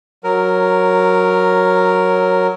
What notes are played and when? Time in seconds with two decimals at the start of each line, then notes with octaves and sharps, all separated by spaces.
0.24 F#3 A#4